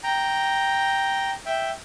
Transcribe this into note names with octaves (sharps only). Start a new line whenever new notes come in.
G5 A#5
E5 G5